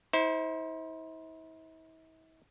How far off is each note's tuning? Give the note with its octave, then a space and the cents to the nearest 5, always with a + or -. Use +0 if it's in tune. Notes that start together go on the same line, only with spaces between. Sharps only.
E4 -45 C5 +0